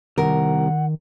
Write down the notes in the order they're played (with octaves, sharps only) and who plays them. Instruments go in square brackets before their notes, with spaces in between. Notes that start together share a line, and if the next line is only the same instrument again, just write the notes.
[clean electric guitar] C2 [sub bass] D#3 [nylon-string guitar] A#4 [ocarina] F#5